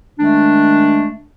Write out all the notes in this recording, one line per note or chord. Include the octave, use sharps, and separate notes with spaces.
D#3 G#3 A3 D4